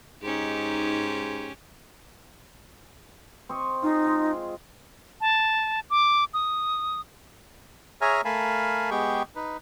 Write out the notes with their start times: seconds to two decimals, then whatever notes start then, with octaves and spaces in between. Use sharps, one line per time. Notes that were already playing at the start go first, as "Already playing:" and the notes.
0.22 G#2 C#4 D#4 G4
3.49 C4 D#5 C#6
3.83 D#4 F4 G#4
4.06 G#3
5.21 A5
5.90 D6
6.34 D#6
8.01 G#4 C#5 E5 G#5 A#5 F6
8.25 A3 A#4 F5 G#5 A5 B5
8.91 G#3 B3 G4 G#4 G5 C#6
9.35 D#4 B4